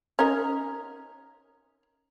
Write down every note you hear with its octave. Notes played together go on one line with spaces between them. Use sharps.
C#4 D#4 A#4